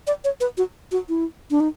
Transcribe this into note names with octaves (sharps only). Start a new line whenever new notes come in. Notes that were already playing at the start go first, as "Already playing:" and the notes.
D5
C#5
B4
F#4
F#4
E4
D4
D#4